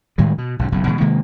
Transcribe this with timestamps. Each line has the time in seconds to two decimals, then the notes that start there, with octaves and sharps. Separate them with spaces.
0.18 A2 D#3 G3 G#3
0.38 B2
0.59 B1 G#2 C#3
0.72 F#1 B1 F#2
0.87 B2 E3 G3 G#3
1.00 C3 D#3 G#3 A#3